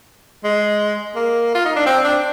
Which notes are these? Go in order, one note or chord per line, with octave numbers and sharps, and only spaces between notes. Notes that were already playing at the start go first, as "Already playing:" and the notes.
G#3
A#3
F4
D#4
D4
C4
D4